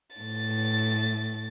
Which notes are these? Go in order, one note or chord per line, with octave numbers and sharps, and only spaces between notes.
A2 A6